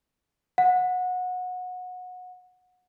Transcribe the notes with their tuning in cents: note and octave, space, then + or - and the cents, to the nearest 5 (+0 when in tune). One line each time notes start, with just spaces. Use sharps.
F#5 -25